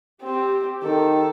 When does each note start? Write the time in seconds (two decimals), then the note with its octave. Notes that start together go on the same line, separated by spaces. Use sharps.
0.23 C4 G4
0.84 D#3 A4